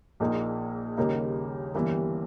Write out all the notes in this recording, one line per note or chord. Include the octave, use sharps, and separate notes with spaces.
A#1 A#2 A#3 D#4 G#4
D#2 C#3 G3 A#3 D#4
G1 G2 E3 G3 A#3